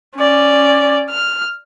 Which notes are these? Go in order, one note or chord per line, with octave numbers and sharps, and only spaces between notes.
C#4 D5
F6